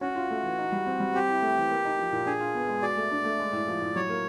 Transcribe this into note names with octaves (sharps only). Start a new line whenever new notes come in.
C#4 F#4
F4
A3
E3
D#4
G3
C4
G3
C4 G4
E4
A3
E3
A#3
D#4
F3
A#2
D4 G#4
F4
B3
G#3
F#4 D5
A3
D4
A3
G#3
A2
F3
A2
F#3 C#5
A#3